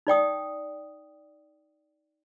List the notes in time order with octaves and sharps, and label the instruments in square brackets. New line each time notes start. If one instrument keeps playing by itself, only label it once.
[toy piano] D#4 D5 G5 D#6